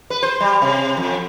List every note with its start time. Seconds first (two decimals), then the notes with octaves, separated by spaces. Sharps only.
0.10 B4
0.23 C5
0.41 G3
0.62 C3
0.97 F2